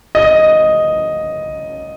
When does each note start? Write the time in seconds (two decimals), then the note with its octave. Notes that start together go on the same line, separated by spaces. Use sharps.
0.15 D#5